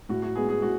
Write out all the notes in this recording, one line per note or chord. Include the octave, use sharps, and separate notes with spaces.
A2 F#4
F#4
G#3 B3 G#4
G#4
A2 F#4